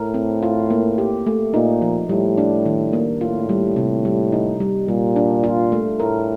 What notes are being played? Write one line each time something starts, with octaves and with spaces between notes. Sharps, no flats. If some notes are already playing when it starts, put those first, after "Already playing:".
Already playing: A2 A#4
C4
F4
A#3
G4
A3
A#2 D#4
F3
A2 G3
D4
D#3
A#3
A2 F4
G3
C3
G3
D#4
G3
A#2 G3
D4
F4
A3
A2 A#4